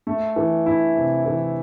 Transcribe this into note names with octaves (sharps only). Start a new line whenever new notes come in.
A3
E3
E4
C3
E3